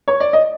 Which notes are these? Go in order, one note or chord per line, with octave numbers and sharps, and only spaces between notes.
C#5
D5
D#5